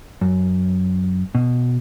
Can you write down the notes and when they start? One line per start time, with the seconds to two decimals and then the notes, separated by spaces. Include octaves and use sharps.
0.21 F#2
1.35 B2